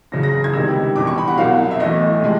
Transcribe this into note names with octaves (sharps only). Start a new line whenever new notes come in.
E2 C#3 F#3 A#6
A#6
A#6
G#6
C#2 C3 D#3 G3 E6
E2 B2 G3 D6
C#6
B5
F#5
C2 B2 F#3 F5
E5
B1 A2 E3 D#5
C3 F3 G#3